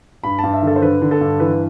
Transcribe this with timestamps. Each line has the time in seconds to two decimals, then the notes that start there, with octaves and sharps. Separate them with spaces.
0.24 G2 B5
0.39 G2 A5
0.53 E5
0.62 D3 A4
0.76 C5
0.82 D3 B4
1.02 D3
1.11 A4
1.21 G2
1.40 E3 B4